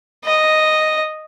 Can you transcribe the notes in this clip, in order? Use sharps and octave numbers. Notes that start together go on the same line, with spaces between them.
D#5